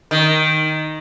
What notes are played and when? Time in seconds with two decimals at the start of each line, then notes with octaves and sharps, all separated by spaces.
0.11 D#3